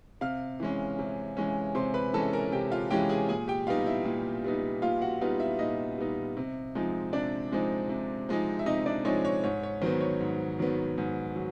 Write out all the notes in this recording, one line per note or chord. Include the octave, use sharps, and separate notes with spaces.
C3 F5 F6
E3 G#3 C#4
C3
E3 G#3 C#4
C3 C5 C6
B4 B5
E3 G#3 C#4 A4 A5
A#4 A#5
C3 G4 G5
F4 F5
E3 G#3 C#4 G4 G5
G#4 G#5
A#2 G#4 G#5
G4 G5
G3 B3 D#4 F4 F5
E4 E5
A#2
G3 B3 D#4
A#2 F4 F5
F#4 F#5
G3 B3 D#4 F4 F5
E4 E5
A#2 D#4 D#5
G3 B3 D#4
C3
F3 G#3 C4 D#4
C3 D4 D5
F3 G#3 C4 D#4
C3
F3 G#3 C4 D#4
E5
C3 D#4 D#5
D4 D5
F3 G#3 C4 D#4 C#5
C#5
G#2 C#5
C#5
D#3 F#3 B3 C5
C#5
G#2
D#3 F#3 B3
G#2
F#3